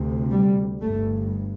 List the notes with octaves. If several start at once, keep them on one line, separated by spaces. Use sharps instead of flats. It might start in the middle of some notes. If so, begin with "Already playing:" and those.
Already playing: D2 C3
G3
G1 G2 A3